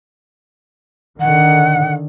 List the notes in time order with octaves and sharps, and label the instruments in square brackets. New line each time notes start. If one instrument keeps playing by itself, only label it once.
[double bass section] D3 D#3 [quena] F#5